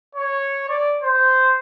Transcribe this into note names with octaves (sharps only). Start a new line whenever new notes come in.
C#5
D5
C5